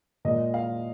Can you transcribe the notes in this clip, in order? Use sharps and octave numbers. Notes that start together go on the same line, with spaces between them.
A#2 G#3 D#5
F5